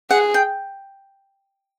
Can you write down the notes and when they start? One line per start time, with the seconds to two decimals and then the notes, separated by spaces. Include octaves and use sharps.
0.10 G#4 F#5
0.34 G5